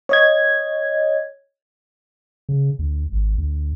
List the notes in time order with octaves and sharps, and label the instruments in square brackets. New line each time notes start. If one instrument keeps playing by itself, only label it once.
[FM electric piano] C#5 D#5 G#6
[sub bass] C#3
D2
G#1
D2